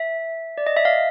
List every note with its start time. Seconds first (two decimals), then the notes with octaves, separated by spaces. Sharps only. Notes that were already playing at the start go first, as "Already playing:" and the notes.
Already playing: E5
0.58 D5
0.67 D#5
0.77 E5
0.85 F5